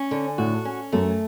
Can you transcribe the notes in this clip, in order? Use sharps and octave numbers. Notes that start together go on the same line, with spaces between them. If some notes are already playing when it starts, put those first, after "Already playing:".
Already playing: C#4
D3
A2 F#4
C#4
F#2 A3